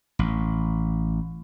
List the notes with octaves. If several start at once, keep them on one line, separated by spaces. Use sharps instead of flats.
A1